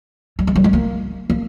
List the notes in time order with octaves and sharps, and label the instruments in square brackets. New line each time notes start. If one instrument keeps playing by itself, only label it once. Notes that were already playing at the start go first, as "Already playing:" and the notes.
[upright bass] G3
G#3
G3
G#3
A#3
A#3